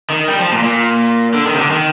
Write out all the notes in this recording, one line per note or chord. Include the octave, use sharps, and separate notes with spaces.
D#3
G3
F3
A#2
A#2
D3
D#3
C3
D3
D#3